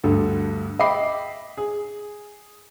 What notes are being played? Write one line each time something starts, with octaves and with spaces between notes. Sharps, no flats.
D2 G2 A4
D#5 E5 G5 B5 D6 C7
G#4